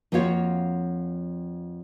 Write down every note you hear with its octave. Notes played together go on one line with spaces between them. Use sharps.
F2 A#3 C4 F4 F#4 C#5